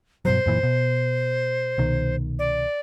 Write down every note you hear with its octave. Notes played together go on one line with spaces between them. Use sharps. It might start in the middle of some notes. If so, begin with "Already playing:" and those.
G2 B2 F#3 C5
F#2 A#2 E3
B2
C2 B2 D#3
D5